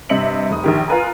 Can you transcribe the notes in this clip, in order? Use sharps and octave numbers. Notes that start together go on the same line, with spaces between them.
G2 C3 D#5 E5 C#7 F#7
F1 D#6
A#1 D#3 G4
F4 A#4 B4 G#5 A#5